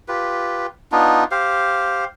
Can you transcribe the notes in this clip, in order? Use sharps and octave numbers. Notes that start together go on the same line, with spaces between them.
F4 G4 B4
B3 D4 D#4 F4
G4 C5 F5